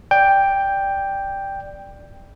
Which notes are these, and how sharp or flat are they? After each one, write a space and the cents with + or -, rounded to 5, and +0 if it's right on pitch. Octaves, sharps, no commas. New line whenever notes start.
D5 +0 G5 +5